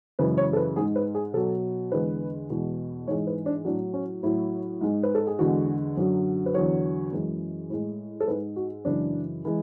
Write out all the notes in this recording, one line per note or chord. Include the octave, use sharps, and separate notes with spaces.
F#2 C#3 E3 G#3 B4
C#5
A4
B4
G#2 G#3 G#4
B4
G#4
B2 F#3 A4
E2 D3 G#3 B4
E2 B2 G#3
G#2 E3 G#3 C#5
B4
D4
A2 F#3 D4
C#4
A2 F#3 E4
G#2 G#3
B4
A4
G#4
E2 D3 G#3 F#4
F#2 D3 F#3
B4
E2 D3 F#3 C#5
F#2 E3 G#3
A2 G#3
A4
G#2 G#3 B4
F#4
F#2 C#3 E3 G#3 D4
E3 G#3